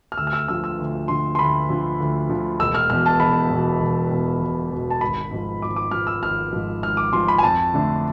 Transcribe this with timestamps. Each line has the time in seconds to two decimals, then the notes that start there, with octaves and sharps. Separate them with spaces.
0.12 F6
0.18 D2 E6
0.27 F6
0.33 E6
0.48 D3 F3 E6
0.64 E6
0.79 D2
1.08 D3 F3 C6
1.35 C6
1.39 D2 B5
1.70 D3 F3
2.00 D2
2.29 D3 F3
2.60 E1 E6
2.75 F6
2.90 E2 B2 F6
3.06 A5
3.20 E1 B5
3.50 E2 B2
3.80 E1
4.11 E2 B2
4.41 E1
4.71 E2 B2
4.90 A5
5.01 G#1 B5
5.31 G#2 F3
5.62 G#1 D6
5.76 D6
5.91 G#2 F3 F6
6.07 E6
6.22 G#1 F6
6.53 G#2 F3
6.82 G#1 F6
6.97 D6
7.13 G#2 F3 C6
7.28 B5
7.38 G#5
7.43 F2 A5
7.74 D3 A3 D4